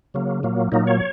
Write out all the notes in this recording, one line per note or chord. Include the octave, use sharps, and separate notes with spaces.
C#3 F#3 A#3
A#2 F#3 A#3
A#2 F#3 A#3 D#4
C#5